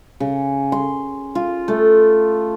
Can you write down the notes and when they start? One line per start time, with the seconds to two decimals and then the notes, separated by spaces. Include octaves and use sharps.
0.20 C#3
0.72 C6
1.35 F4
1.68 A3